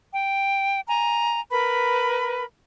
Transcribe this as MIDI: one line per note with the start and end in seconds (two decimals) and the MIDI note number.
0.13 0.79 79
0.88 1.39 80
0.88 1.39 82
1.51 2.44 70
1.51 2.44 71
1.51 2.44 83